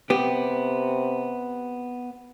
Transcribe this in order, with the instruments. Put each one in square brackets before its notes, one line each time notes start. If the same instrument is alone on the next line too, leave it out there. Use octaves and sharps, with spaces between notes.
[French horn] C3 [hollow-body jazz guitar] B3 G4